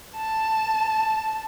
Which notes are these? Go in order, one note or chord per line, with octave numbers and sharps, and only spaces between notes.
A5